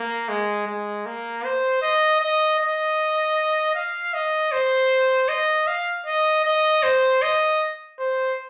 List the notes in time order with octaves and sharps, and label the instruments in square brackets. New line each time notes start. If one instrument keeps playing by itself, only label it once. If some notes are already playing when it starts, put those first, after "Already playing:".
Already playing: [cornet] A#3
G#3
G#3
A#3
C5
D#5
D#5
D#5
F5
D#5
C5
D#5
F5
D#5
D#5
C5
D#5
C5